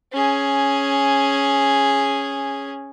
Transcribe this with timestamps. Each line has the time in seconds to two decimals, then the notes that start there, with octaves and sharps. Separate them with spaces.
0.13 C#4 G#4